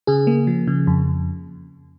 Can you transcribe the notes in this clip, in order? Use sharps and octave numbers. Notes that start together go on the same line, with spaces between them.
C#3 G#4
A#3
F3
C#3
F2